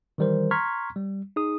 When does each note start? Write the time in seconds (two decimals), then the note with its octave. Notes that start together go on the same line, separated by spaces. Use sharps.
0.18 D#3 E3 G3 A#4 C5
0.51 A#5 C6 C#6 F6 G#6 B6
0.96 G3
1.36 D#4 G#4 D#6